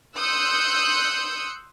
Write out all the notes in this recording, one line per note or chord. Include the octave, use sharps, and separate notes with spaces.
C6 D#6 E6 F#6 G6 C#7